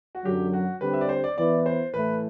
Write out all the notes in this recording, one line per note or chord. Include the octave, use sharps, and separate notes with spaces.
F#4
F#2 D3 F#3 G4
F#4
D3 G3 C4 G4 B4
E5
D5
C5
D5
E3 B3 E4 B4 D5
C5
A2 E3 A3 B4